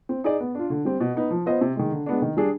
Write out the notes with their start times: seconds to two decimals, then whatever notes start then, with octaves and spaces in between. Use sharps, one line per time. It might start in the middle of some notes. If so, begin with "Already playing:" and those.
0.09 C4
0.24 D#4 G#4 D5
0.40 B3
0.55 D4 F4
0.70 D3
0.85 G3 C4
1.00 B2
1.15 B3 D#4 B4
1.31 F3
1.46 B3 F4 C5 D#5
1.61 C3
1.76 D#3 G#3
1.91 D3
2.06 G#3 B3 D4
2.22 D#3
2.37 G3 D4 G#4